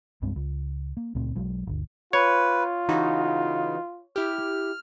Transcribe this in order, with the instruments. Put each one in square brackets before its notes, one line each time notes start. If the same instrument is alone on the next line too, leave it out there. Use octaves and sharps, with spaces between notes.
[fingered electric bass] C2 G2 G#3 C4
C#2
A#3
C#2 A#2 A3 C4
B1 F#3 G#3
G1 D2
[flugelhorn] F4 [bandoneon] B4 [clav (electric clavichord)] C#5
[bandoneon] C#3 [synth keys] E3 D#4 F#4
[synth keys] E4 G4 [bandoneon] F6